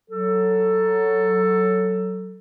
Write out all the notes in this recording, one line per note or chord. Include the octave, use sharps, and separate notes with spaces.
F#3 A4